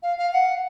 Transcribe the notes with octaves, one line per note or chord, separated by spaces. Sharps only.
F5
F5
F#5